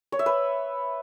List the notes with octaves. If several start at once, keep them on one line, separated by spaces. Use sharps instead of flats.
C#5
E5
B4